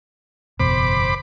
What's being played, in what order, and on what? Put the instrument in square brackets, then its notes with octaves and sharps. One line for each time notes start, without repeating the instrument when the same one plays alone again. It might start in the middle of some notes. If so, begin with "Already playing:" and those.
[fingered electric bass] F#1 E2 B2 [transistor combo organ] C5 B5 D6